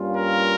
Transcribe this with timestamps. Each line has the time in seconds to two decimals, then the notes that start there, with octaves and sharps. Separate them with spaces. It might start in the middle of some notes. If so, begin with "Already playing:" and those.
Already playing: G2 G3 A#3 C#4 F4
0.16 A#4